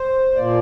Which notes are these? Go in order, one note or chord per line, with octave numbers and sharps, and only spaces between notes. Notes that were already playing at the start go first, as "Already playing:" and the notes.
Already playing: C5
A#2 F3 A#3 D5